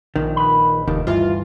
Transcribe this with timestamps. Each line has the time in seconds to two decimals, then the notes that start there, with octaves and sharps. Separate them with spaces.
0.16 A#1 D#3
0.36 B4 D#5 B5
0.87 F1 D#2 D#3
1.07 D2 G2 E3 F4